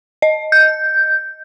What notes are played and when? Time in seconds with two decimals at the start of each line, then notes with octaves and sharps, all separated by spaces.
0.22 D#5
0.52 G6